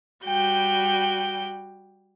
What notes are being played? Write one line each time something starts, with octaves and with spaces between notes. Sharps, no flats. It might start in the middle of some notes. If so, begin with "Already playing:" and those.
G3 F#4 G5 G6